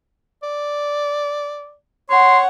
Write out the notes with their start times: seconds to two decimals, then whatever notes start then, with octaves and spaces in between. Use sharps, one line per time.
0.43 D5
2.10 C#5 F#5 C6